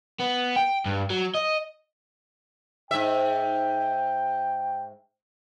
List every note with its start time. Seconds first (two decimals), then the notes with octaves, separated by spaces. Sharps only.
0.19 B3
0.56 G5
0.85 G2
1.10 F#3
1.34 D#5
2.91 G#2 E5 G5